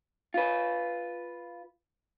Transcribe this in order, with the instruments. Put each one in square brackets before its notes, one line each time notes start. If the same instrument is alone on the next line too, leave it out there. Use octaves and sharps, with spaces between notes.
[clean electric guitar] F4 B4